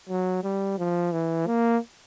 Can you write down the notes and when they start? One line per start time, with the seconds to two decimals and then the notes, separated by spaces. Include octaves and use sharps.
0.09 F#3
0.43 G3
0.78 F3
1.12 E3
1.46 A#3